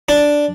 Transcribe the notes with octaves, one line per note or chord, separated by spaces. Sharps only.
D4